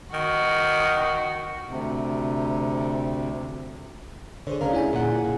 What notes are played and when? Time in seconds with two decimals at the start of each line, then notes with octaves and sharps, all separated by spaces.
0.13 D#3 F#4
1.70 D2 C3
4.47 D3 G#4 C5 C#5
4.61 D2 C#4 D4 A#4 F5 A#5
4.73 E4 G#4 G#5
4.93 A#2 F#5
5.24 A#2